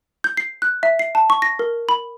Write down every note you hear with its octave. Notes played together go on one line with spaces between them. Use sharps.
G6
C7
F#6
E5
C7
A5
C#6
A#6
A#4
B5